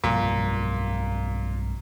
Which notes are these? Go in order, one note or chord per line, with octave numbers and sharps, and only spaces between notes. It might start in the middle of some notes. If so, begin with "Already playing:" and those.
B1 G2 A#2 F3